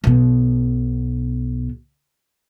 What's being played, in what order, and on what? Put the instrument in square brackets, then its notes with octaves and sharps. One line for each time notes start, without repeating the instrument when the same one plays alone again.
[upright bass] B1 B2